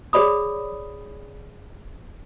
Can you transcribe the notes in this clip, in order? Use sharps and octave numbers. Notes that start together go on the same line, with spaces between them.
G#4 C#5 D5 B5 D#6